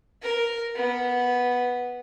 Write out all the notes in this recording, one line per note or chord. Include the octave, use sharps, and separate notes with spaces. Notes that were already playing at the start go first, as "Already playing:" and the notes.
A#4
B3